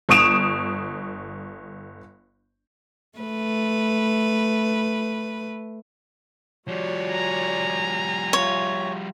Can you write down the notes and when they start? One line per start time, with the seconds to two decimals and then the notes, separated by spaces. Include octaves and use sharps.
0.09 G1 C#6 D#6 D7 E7 F7
3.19 A3 B4
6.68 F3 G3 F#4 C#5 D5
7.09 G#5 A#5
8.33 F4 C#5 E5